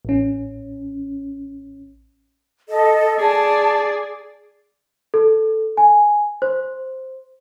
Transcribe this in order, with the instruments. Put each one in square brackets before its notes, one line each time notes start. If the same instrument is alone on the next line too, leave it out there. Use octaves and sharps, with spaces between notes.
[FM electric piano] A1 C#4
[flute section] A4 D#5
[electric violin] G#4 D5 [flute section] A5
[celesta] A4
G#5
C5